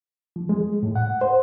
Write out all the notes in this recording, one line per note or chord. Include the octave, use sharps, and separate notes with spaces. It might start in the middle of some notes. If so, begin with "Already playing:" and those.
F3
G#3
A2
F#5
C5